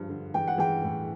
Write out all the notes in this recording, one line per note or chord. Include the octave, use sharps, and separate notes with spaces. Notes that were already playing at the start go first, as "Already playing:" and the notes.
Already playing: G2 F3
D3
E3 G5
F#5
E3 G5
A2